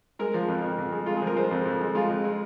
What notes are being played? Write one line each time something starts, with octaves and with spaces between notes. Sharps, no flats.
G#3 A#4
F3
F2
F2
F2
G#3
G#3 F4
G#4
F3 A#4
G#3 C5
F2
F2
G#3
G#3 F4
F2
G#3